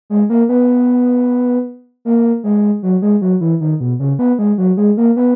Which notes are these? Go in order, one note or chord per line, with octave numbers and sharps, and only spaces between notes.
G#3
A#3
B3
A#3
G#3
F#3
G#3
F#3
E3
D#3
B2
C#3
B3
G#3
F#3
G#3
A#3
B3